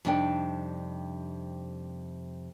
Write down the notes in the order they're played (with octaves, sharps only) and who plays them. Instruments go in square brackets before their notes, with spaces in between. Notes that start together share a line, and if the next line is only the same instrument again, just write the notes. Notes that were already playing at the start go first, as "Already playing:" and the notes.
[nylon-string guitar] F2 C3 G3 D4 D#4 G5